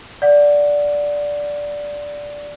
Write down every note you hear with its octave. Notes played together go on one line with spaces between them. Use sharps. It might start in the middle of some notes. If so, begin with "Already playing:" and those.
D5 F#5